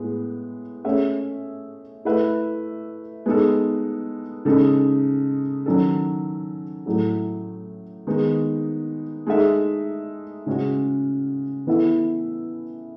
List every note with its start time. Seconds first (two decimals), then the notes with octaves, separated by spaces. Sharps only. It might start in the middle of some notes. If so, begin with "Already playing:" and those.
Already playing: A2 G#3 B3
0.84 A3 C#4 G#4 C#5 E5
2.05 A3 E4 B4 E5
3.26 G#3 B3 D#4 A4
4.45 C#3 G#3 D#4 A4
5.66 D#3 F#3 C#4 F#4 A4
6.86 A2 F#3 A3
8.07 D#3 G#3 B3 D#4
9.27 G#3 D#4 A4 E5
10.46 C#3 G#3 C#4 F#4
11.67 E3 B3 E4 A4 E5